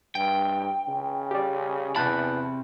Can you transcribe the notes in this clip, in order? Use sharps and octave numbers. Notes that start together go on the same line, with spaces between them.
G2 G5
C#3
G4 D5
E2 C3 A5 B5 F#6 G6